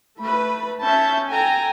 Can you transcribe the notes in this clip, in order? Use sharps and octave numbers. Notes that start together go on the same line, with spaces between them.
A3 B4 B5
C#4 E5 A5 G6
A4 G5 G#5 A#5